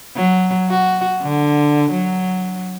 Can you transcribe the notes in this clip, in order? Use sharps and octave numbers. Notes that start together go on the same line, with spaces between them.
F#3
F#4
D3
F#3